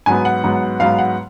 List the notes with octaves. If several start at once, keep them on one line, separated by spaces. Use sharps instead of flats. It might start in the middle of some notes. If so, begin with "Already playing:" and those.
G#2 F#3 B3 G#5
F#5
G#2 F#3 B3
G#2 F#3 B3 F5
F#5